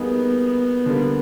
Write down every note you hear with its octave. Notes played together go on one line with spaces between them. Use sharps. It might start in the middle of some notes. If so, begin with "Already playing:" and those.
Already playing: G3 A#3 B3 D#4 G#4
D3 G3 A#3